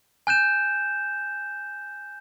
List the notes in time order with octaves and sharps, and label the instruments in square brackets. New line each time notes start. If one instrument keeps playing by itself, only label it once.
[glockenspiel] G#5 F#6 G6 E7